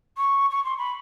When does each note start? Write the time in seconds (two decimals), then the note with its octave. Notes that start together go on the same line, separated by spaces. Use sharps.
0.17 C#6
0.50 C#6
0.64 C6
0.78 B5